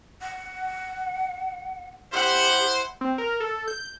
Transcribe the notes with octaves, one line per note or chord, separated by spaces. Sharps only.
F#5
E4 G4 C5 F#5
C4
A#4
A4
G6